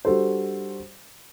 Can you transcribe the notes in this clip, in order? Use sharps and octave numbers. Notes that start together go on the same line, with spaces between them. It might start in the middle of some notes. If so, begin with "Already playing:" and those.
G3 D4 F#4 A4 C5